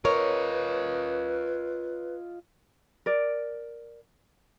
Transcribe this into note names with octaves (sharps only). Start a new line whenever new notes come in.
F4 A#4 B4 C#5 D#5
A#4 D5